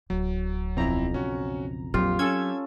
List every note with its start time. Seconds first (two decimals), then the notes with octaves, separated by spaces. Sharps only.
0.10 D1 F#3
0.77 B1 F2 C4 E4 A#5
1.14 C#3 C#4 F#4
1.94 A#1 F2 F#3 C4 F4 G4
2.19 C#4 A4 E6 G#6